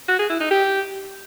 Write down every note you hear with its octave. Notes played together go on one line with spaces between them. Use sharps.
F#4
G#4
E4
D#4
G4